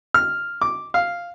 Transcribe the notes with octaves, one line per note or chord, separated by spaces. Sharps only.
F6
D6
F5